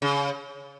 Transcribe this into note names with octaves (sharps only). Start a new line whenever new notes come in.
C#3